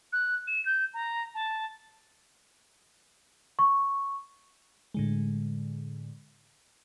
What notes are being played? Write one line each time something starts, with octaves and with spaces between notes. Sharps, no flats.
F#6
E7
G6
A#5
A5
C#6
A2 D3 G#3